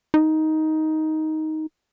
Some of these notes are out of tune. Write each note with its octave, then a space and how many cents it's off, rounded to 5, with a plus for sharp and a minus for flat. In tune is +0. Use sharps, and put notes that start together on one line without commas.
D#4 +10